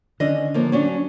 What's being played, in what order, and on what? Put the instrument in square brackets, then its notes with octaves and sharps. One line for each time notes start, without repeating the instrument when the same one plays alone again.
[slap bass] D3 D#3 [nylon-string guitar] C#4 D4 D#5
[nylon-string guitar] F3 F#3 A#3
F#3 C#4 D4